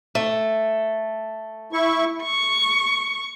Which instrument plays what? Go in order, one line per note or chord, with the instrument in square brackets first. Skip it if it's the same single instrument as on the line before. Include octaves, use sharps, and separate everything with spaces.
[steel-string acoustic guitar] A3
[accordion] E4 C#6
[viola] C#6